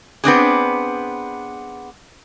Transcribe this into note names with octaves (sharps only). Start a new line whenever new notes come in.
B3 C4 D4 G#4